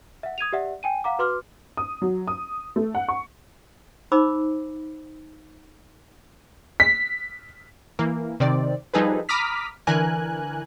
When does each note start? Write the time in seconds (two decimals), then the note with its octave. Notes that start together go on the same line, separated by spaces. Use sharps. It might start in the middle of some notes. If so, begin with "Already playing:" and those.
0.23 E5 F#5
0.38 D#6 G#6 D#7 F7
0.52 G4 D5 E5 F#5
0.83 G5 G#5 D#7
1.04 F5 F#5 A#5 D6
1.19 F#4 B4 C6 D6 F6
1.77 D#6
2.02 F#3
2.28 D#6
2.76 A3
2.95 F#5
3.09 C#6
4.12 D#4 C5 B5 D6 E6
6.80 B6
7.99 E3 A#3
8.40 C3 D#3 C4 D5
8.94 F3 G3 D#4 G#4 A4 B4
9.29 A#5 B5 D6 D#6 F6 B6
9.87 D3 E3 A#4 G#5 F#6